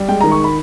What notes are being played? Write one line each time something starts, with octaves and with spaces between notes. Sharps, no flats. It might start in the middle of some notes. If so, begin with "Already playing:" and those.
Already playing: G3
G#3 G5
D#3 A#5
C#6
B5